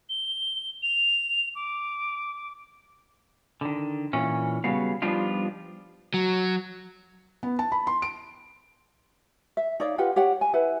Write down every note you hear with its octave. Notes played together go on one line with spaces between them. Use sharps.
G7
F7
D6
D3 D#3
A#2 E3 C#4
C#3 F#3 G3 B3 F5
F3 G3 B3 D4 D#4 F4
F#3
B3
A5
B5
C6
D7
E5
D#4 C#5 D5 F5
F4 G4 B4 F#5
G4 C#5 F#5 G5
G#5
E4 B4 F#5